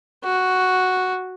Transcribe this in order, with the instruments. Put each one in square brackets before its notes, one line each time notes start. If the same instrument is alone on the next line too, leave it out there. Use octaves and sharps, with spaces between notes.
[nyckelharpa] F#4